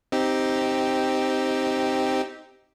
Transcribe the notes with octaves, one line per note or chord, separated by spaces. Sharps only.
C4 D#4 G4